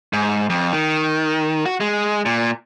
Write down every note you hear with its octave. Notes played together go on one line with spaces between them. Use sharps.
G#2
F2
D#3
F#4
G#3
A#2